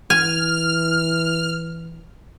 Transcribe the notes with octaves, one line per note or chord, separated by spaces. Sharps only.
E3 G#5 F6